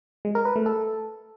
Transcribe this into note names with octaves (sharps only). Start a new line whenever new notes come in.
G#3
A#4
B4
A3
A4